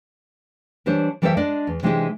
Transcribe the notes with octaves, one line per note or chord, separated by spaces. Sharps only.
E3 G3 D4 C5 C#5
E3 G3 A4 A#4 C5 E5
G#3 D4 D5 D#5
E2
C3 E3 G#3 D4 D#4 G4